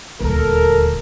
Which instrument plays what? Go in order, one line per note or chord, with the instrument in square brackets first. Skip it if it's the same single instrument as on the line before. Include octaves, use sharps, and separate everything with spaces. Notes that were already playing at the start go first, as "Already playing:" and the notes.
[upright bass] D#1 D2 [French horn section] A4 A#4